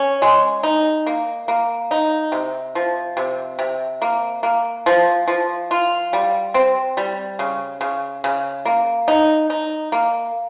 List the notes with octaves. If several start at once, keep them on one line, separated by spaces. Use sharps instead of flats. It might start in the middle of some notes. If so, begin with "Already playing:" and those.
Already playing: C#4
G#3
D#4
A#3
A#3
D#4
C3
F3
C3
C3
A#3
A#3
F3
F3
F4
G3
C4
G3
C#3
C#3
C#3
A#3
D#4
D#4
A#3